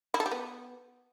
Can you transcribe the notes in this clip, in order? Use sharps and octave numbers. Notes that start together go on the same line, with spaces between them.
E4
A4
G4
B3